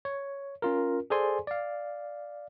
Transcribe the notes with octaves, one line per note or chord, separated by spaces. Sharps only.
C#5
C#4 F4 A#4
G#4 A4 C5 D5 G#5 C6
D5 F5